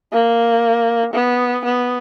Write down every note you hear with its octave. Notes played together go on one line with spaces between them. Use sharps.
A#3
B3
B3